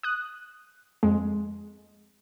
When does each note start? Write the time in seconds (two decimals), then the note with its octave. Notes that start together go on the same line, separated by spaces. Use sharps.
0.03 D#6 F#6
1.03 F2 G#3